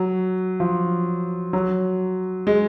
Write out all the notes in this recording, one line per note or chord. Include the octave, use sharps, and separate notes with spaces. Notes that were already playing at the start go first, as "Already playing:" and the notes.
Already playing: F#3
F3
F#3
G#3